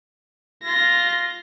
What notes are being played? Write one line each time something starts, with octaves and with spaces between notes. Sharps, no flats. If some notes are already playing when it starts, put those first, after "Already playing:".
F4 A#6